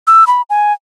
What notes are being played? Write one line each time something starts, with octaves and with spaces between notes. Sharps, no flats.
E6
B5
G#5